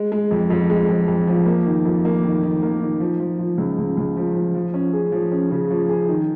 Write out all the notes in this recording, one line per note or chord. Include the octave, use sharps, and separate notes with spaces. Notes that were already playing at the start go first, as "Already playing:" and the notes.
Already playing: G#3
G#3
F2
F2
G#3
F2
F2
F3
A#3
D#3
F2
A#3
D#3
D#3
A#3
D#3
F3
F3
F3
C#2
C#2
C#2
F3
F3
F3
C#4
G#4
F3
C#4
C#3
F3
G#4
D#3